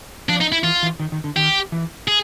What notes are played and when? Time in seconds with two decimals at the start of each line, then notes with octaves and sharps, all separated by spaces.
0.29 F3 D4
0.41 D#4
0.52 E4
0.64 E3 F4
0.83 E3
1.00 D#3
1.12 D#3
1.24 D3
1.36 D#3 G4
1.72 E3
2.08 G#4